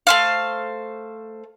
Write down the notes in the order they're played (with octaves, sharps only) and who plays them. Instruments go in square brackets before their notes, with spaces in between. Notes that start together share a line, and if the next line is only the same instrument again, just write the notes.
[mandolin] A3 C5 F5